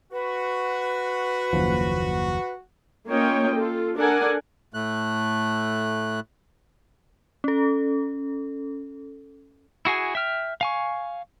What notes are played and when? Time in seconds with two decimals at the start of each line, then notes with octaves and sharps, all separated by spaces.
0.12 F#4 B4
1.53 F#1 D#2 F3
3.07 A#3 C#4 F4 C#5 D#5 G5
3.54 F4 A4
3.96 D4 A4 A#4 D5 F#5 G#5
4.74 A2 A3 F#6
7.44 C#4 A4
9.85 E4 F#4 G#4 G#5
10.15 E5 G5 F6
10.61 F5 G#5 C#6